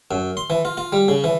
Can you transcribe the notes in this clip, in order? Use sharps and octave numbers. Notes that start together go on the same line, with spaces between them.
F#2
C6
E3
F4
F4
G3
C#3
E3